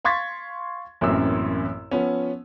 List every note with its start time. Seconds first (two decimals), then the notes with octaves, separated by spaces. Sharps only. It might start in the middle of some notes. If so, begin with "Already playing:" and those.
0.05 F5 C6 C#6 G#6 A6 B6
1.01 A1 F#2 E3 A#3 C4 E6
1.91 F3 B3 C#4